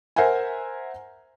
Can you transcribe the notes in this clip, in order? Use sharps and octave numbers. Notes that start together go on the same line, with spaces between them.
A#4 C5 E5 F#5 G#5